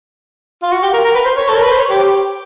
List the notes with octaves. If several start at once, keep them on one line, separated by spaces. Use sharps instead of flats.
F4
F#4
G4
A#4
A#4
B4
C5
C#5
A4
A#4
B4
C5
C#5
G4